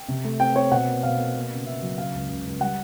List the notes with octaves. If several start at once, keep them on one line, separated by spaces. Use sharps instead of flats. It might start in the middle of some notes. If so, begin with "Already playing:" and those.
Already playing: G5
C3
A3
C4 G5
C4 C#5
B2 F#5
A#3
B2 F5
A#3
A#3
C#3
C#3 E5
F#3
C#3 F5
C#2
C#2
C#2
G3 F#5